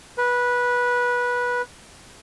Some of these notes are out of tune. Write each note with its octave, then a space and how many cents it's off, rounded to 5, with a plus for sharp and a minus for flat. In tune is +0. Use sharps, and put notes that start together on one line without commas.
B4 -15